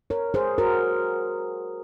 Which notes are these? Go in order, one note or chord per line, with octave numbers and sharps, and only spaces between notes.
A#4 C#5
G#4 C5
F#4 A#4